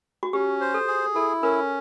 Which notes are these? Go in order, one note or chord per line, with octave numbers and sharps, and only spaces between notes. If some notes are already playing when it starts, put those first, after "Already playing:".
F#4
C#4 G4
C5
A4
G#4
E4 A4
C#4 A#4